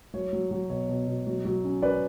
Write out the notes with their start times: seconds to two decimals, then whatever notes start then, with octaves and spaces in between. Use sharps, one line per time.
0.14 F#3 C#5
0.33 F#3
0.51 F#3
0.70 B2 C#5
0.89 B2
1.07 B2
1.27 F#3
1.45 F#3
1.64 C#4
1.82 C#4 B4 D5